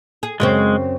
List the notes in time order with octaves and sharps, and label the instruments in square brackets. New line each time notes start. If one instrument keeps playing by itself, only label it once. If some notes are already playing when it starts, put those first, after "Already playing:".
[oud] G#4
[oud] F#2 C#3 C4 [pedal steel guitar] G#3